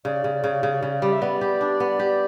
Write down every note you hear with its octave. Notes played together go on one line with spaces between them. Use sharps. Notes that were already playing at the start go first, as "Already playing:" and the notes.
C#3 D5
C#3
C#3
C#3
C#3
G3
E5
B3 D5
G4
D4
B3
G4